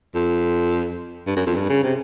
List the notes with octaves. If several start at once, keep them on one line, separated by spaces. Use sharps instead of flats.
F2
G2
F#2
F2
G2
C#3
C3